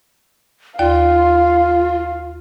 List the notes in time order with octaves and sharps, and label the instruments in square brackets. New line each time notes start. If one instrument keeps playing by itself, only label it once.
[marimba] D#2 D5 [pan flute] F4 [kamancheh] F5